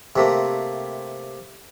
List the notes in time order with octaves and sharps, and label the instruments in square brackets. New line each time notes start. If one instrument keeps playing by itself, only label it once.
[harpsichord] C3 A3 A#3